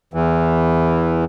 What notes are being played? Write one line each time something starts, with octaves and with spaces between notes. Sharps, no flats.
E2 E3